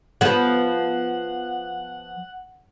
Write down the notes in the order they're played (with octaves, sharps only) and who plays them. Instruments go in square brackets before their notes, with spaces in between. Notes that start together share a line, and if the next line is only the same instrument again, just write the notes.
[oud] F3 B3 [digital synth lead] F#5